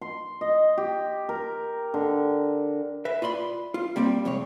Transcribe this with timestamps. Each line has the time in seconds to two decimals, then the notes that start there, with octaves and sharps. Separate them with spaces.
0.02 C6
0.41 D#5
0.78 G4
1.29 A#4
1.94 D3
3.05 B4 E5
3.22 F4 D5 B5 C6
3.74 F4
3.96 G3 A#3 C4 D5
4.25 C2 F2 G#3 C#5